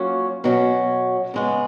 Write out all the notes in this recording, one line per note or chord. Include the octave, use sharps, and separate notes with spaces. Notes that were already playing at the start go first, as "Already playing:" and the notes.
Already playing: F#3 A#3 C#4 F4
B2 F#3 C#4
C#3 G#3 B3